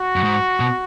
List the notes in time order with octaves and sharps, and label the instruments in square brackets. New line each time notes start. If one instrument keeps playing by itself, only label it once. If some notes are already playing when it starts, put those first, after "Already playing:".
Already playing: [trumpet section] F#4
[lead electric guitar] F#2
G#2
B2